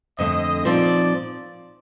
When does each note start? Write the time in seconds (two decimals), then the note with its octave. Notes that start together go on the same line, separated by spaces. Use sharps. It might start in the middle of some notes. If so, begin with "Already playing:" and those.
0.18 F2 D3 A3 D#5
0.65 A#2 F3 C4 D#4 D5